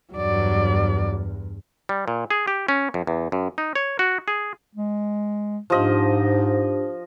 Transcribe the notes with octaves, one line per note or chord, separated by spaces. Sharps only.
E2 G2 F#3 D5
G3
A#2
G#4
G4
C#4
F2
E2
F#2
D#4
C#5
F#4
G#4
G#3
G#2 F3 D4 G4 D#5